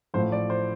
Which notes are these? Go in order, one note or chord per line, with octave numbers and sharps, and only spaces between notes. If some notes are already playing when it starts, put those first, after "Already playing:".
A1 A2 F3 C5
D5
C5